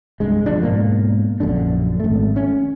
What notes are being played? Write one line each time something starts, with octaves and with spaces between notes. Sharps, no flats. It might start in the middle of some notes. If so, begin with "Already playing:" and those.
C2 G2 G#3
F#1 F3 D4
G#2 B2 A#3
A#1 F#2 D3 D4
G#1 A3
C#4